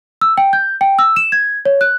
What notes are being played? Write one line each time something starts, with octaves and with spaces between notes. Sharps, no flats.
E6
G5
G6
G5
E6
E7
G#6
C#5
F#6